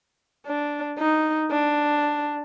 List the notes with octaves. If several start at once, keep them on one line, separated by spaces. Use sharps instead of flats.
D4
D#4
D4